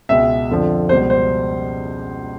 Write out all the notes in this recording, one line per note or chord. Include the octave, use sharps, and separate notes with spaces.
C#2 B2 G#3 E5
F2 D3 F3
C#2 B2 G3 C5
C5